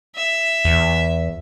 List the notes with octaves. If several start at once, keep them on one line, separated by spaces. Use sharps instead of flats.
E5
E2